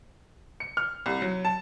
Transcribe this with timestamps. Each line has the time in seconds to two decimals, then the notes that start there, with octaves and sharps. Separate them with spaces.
0.60 C#7
0.77 F6
1.06 C2
1.22 F#3
1.45 A5